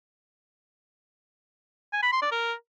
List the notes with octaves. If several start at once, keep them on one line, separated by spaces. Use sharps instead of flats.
G#5
B5
C6
D5
A#4